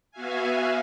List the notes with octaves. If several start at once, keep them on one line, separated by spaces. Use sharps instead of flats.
B3 F#4 E5 F5 G#5